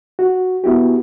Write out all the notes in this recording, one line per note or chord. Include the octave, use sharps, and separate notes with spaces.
F#4
B3 E4 F#4 G4